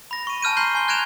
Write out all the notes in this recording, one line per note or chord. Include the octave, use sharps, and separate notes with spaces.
B5 A#6
C#6 D#7
G#5 A5 F6 G6 D#7
A#5 C6 G6 C7 G7
G#5 C6 G7
F#6 G#6 A#6 D7 E7 F7